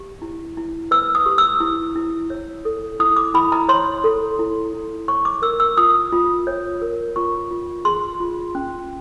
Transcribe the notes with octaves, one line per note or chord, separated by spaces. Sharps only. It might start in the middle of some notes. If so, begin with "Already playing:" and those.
Already playing: G4
E4
E4
B4 E6
D#6
G4
E6
E4
E4
C#5
A4
E4 D#6
D6
E4 B5
A#5
C#5 C6
A4
E4
E4
C#5 C#6
D6
A#4 E6
E6
F4 D#6
F4
C#5
A#4
F4 C#6
F4
G#4 C6
F4
C#4